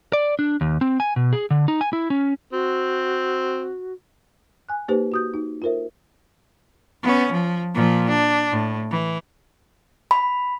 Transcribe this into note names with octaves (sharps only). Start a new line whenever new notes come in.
D5
D4
D#2
C4
G#5
B2
G#4
D3
D#4
G#5
E4
C#4
C4 F#4
G#5 F#6
A#3 D#4 G4 B4 C5
F#4 D#6 G6
D#4
F4 A4 A#4 C5 E5
B3 C#4
F3
A#2 F3
D4
A2
E3
B5